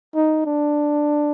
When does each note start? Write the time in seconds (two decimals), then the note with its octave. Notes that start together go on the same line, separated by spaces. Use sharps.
0.16 D#4
0.46 D4